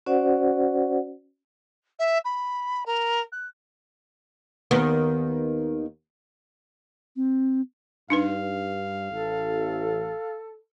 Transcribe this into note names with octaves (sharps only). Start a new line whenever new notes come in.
C#4 F#4 C5 D5 F#5
E5
B5
A#4
F#6
D#2 D#3 B3
C4
G2 D4 D#4 B4 F5
A1 A4